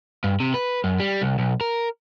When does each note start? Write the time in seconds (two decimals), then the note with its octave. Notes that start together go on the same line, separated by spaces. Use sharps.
0.24 G2
0.40 C3
0.54 B4
0.84 F#2
1.00 G3
1.22 C2
1.39 B1
1.61 A#4